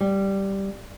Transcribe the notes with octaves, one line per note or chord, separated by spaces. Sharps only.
G3